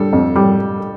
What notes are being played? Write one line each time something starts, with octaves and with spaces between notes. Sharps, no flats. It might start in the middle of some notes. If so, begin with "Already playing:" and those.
Already playing: D3 G3 A4
F2
G3